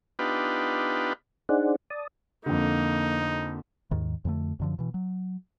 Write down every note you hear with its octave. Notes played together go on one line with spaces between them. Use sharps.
B3 D4 D#4 F4 G4 B4
D4 D#4 G#4 C5 D5 F#5
D5 A5 D#6
F2 D3 A#3 D#4
D#2 G#2 D#3
F2 D3 G#3 A3
F#2 D3 F3
B2 E3
F#3